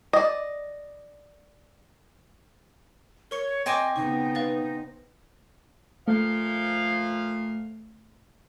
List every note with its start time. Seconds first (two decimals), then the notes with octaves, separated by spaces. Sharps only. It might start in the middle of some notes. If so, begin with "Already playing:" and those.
0.13 D5 D#5
3.31 A#4 C#5 C#6 C#7
3.66 C4 D#5 G5 G#5 C#6 D6 A#6
3.96 C#3 B3 D#4 C#6
4.35 B4 F5 A6
6.08 A#2 F3 A3 F5